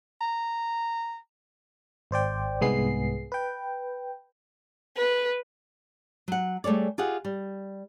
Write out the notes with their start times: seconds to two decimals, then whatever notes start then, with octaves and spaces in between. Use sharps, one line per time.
0.21 A#5
2.11 G#1 C5 D5 G5
2.61 C2 G#2 G#3 B3 G#4 C7
3.32 B4 G5
4.97 B4
6.28 F#3 F#5
6.64 G3 A3 G#4 C#5 D5
6.98 F4 G4 G#4 D#5 F#5
7.25 G3